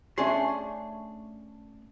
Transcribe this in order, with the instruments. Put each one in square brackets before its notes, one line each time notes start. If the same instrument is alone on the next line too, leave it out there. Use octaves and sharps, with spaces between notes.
[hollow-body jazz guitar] A3 C#4 D4 G#4 C6